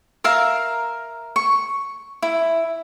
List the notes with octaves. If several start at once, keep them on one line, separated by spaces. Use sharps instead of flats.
A#4 E5 F5 A#5
C#6
E4